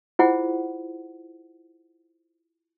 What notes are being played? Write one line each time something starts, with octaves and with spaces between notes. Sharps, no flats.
E4 F4 G#4 C5 F#5